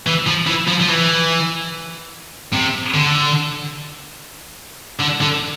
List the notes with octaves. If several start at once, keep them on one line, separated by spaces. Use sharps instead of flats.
E3
F3
E3
F3
F3
E3
C3
D3
D3
D3